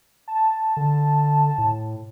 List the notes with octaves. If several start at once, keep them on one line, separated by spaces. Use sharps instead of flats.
A5
D3
A2